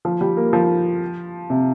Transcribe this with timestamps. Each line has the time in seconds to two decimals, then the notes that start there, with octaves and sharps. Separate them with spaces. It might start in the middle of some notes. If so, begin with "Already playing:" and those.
0.05 F3
0.21 G3
0.37 A#3
0.53 F3
1.50 C3